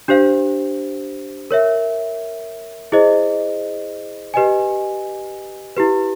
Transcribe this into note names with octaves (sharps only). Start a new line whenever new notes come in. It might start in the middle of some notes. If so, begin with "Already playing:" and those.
D4 G4 C5 F5
A#4 C#5 E5
E4 G#4 C5 D#5
G4 B4 D#5 G#5
E4 G4 B4